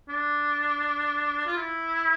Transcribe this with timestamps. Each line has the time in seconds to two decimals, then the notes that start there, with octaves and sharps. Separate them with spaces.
0.09 D4
1.46 F4
1.56 E4